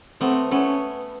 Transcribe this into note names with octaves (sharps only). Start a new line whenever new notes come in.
A3 B3 C4
A3 B3 C#4